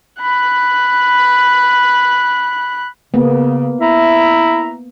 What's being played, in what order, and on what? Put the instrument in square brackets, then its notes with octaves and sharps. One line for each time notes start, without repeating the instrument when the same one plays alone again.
[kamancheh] B5 F#6
[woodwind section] C#3 [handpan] A#3 B3
[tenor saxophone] E4 [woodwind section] E5 A#5